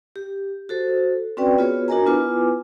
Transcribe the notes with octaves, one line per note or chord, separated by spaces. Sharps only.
G4
F#4 A4 C5
C4 C#4 F#4 B4 D5 G5
B3 F4 F#4 G#4 B4 C#5
D4 F#4 A#4 D#5 G#5 A#5
B3 E4 F4 B4 G#5 D6